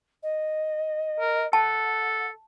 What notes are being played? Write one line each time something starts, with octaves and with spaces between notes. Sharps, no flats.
D#5
A#4
A4 F#5 A5